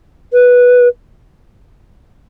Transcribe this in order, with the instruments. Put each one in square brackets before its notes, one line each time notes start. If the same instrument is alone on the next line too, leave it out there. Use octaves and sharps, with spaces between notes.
[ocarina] B4